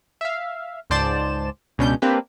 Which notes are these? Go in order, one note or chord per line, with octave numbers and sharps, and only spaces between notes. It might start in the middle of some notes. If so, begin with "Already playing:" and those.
E5 F5
C#2 G#2 C5 D5 A5 E7
C#2 B2 C#4 D4 G6
A#3 C4 D4 G4 B4